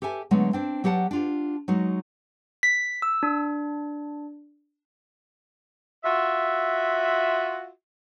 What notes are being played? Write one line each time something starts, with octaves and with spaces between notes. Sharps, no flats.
G4 A4 E5 G#5 A5
D3 F#3 G#3 A3 B3
C4 D4 C5
F#3 G4 D5 F#5 A5
D4 F4 G4
F#3 G#3 D#4 F#4
B6
E6
D4
F4 F#4 E5